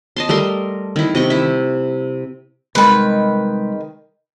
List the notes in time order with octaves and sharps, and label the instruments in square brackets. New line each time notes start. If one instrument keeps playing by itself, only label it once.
[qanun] D#5 A5 C6
G3 A3 A#4 C6
D#3 E4
C3 D#5 C#6
E4 E5
[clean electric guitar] C2 G#3 B5 [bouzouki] D#3 B4